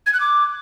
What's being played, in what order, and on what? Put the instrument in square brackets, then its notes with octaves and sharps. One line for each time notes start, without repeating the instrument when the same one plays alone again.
[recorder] G#6
F#6
D6